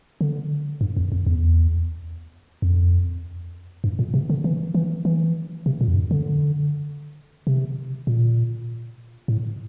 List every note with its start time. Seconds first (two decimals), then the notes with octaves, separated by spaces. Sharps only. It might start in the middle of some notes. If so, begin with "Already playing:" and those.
0.21 D3
0.81 G2
0.97 F2
1.12 F2
1.26 E2
2.62 F2
3.84 G2
3.99 A#2
4.14 C3
4.30 D3
4.44 E3
4.74 E3
5.05 E3
5.66 C3
5.81 A#2
5.88 F2
5.95 G2
6.11 D3
7.47 C3
8.07 A#2
9.28 A2